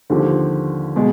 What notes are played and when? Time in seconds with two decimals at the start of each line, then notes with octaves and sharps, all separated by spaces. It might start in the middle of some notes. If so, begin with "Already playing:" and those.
0.10 D#2 D3 F3 C4 G4
0.96 B2 G#3